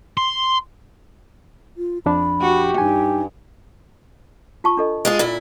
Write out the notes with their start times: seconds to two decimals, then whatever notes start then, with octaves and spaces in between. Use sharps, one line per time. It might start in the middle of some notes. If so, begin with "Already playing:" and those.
0.17 C6
1.77 F4
2.06 F2 F3 D4 B5
2.42 F#4 G4
2.78 G2 D#4 G#5
4.64 F4 A5 C#6
4.77 D4 A4 D#5
5.05 G#3 F4 G#4
5.19 A#2 E4